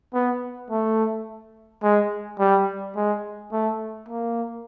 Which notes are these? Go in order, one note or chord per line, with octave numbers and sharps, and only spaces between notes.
B3
A3
G#3
G3
G#3
A3
A#3